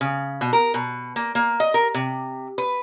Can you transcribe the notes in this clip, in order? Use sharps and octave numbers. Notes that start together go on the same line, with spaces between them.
C#3
B2
A#4
B2
A#3
A#3
D#5
A#4
C3
B4